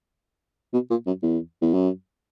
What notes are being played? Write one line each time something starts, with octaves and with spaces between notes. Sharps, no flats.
B2
A#2
F#2
E2
E2
F#2